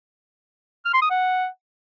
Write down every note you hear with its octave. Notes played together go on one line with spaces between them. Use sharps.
F6
C6
D#6
F#5